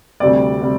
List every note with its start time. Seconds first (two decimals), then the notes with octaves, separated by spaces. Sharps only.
0.20 D2 C3 G3 C4 D5
0.61 C3 G3